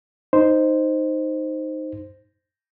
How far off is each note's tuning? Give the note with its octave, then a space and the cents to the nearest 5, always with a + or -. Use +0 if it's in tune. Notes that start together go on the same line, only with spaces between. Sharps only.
D#4 +0 C5 +0